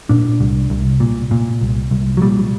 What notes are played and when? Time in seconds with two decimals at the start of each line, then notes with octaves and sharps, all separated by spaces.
0.09 A#2 D4
0.41 C2
0.70 C2
1.00 A#2
1.31 A#2
1.61 C2
1.91 C2
2.17 F#3
2.21 A#2 G3